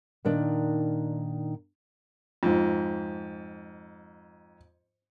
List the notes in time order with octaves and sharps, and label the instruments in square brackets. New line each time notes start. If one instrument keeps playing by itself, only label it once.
[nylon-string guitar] A#2 D#3 D4 D#4
[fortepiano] F2 G#2